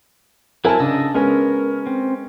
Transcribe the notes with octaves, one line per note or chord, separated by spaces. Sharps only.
F#3 C4 E4 A#4 G#5 A5
C#3 D4 D#5 A5 E6
G#3 B3 C#4 A#4
C4